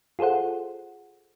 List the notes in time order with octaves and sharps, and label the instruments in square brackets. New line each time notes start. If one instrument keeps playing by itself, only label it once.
[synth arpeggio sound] F4 G#4 A4 C5 F#5